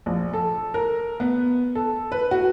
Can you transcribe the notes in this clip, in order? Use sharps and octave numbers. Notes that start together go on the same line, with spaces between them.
A#1
A4
A#4
B3
A4
B4
F#4